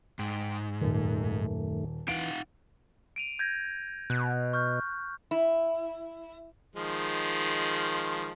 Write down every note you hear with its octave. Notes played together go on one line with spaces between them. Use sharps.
G#2 G5
D#1 F#2 D#3 A3
E3 D#4 F5 F#5 D7
D7 D#7 F7
G6 G#6 A#6
B2 F#6
C#6 F6 G6
E4
D#3 F3 G#3